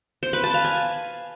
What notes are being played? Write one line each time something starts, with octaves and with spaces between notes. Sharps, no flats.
C5
B4
A5
F5
G#5